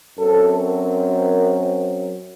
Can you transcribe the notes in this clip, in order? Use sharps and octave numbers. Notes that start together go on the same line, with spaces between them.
F#2 F#3 C4 A4
A#4